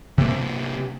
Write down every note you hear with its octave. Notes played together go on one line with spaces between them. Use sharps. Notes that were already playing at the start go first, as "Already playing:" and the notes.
C3 A#3